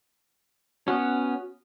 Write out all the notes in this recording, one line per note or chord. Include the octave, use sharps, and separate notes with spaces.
B3 C#4 F#4